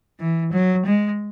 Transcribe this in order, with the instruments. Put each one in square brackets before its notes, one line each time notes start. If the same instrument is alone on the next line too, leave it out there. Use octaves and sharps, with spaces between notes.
[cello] E3
F#3
G#3